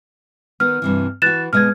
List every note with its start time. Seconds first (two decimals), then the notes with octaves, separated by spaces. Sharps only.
0.60 D#3 B3 F6
0.82 G2 C3 E3
1.22 E3 F#4 F#6 A6 E7
1.53 B2 G#3 D#5 F6 G#6